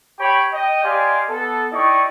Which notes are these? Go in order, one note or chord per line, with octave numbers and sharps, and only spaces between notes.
G4 C#5 G5 B5 C#6
D#5 G5
G4 D5 D#5 F5 G#5 C6
B3 A4
D#4 E4 G4 D5 D#5 C#6